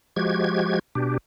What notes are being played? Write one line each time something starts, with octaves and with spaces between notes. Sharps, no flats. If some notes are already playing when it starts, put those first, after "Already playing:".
F3 G#3 F#4 G4 G#6
B2 D4 G4